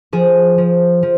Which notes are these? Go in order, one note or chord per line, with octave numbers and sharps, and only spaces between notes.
F3 G#4
F3
F3